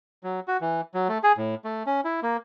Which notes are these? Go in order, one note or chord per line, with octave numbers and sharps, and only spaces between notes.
F#3
F#4
E3
F#3
A3
G#4
A2
A3
C#4
E4
A#3